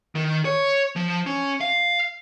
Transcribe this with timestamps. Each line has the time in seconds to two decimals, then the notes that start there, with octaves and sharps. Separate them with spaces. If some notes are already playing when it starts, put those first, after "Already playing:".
0.15 D#3
0.45 C#5
0.96 F3
1.26 C#4
1.61 F5